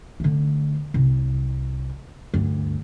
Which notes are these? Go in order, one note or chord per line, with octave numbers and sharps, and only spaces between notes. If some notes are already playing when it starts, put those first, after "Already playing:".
D3 A3
C2
D2 G2